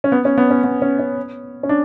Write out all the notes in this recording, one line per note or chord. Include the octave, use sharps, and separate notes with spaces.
C#4
B3
C#4
B3
C#4
B3
C#4
C#4
C#4
D4